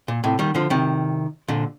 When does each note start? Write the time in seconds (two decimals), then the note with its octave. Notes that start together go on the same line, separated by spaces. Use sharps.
0.08 A#2
0.24 A2 C3
0.39 D#3 G3
0.55 D3 F3
0.70 C3 D#3
1.48 A#2 D3